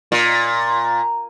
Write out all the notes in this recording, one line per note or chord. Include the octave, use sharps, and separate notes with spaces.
A#2